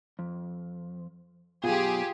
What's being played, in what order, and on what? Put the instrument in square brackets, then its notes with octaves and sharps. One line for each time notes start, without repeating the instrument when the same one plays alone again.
[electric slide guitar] F2
[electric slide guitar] F#2 B2 [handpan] F4 [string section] G4 G#4